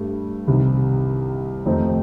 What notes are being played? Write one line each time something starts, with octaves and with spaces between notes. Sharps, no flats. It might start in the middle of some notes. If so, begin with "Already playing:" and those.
Already playing: G2 A3
C2 C3 D#3
F2 D#3 A3 C4 D#4